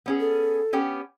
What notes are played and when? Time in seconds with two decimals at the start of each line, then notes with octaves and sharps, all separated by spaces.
0.06 B3 C#4 G#4
0.20 A4
0.73 B3 C#4 G4